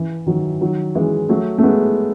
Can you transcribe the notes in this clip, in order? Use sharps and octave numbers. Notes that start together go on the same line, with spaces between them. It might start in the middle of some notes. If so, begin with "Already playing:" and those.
Already playing: E3
D#3 F#3
D#3 F#3
E3 G#3
F#3 A3
A3
G#3 B3